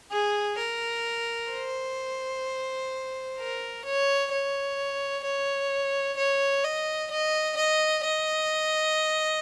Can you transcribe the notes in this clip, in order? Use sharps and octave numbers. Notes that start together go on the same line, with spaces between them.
G#4
A#4
C5
A#4
C#5
C#5
C#5
C#5
D#5
D#5
D#5
D#5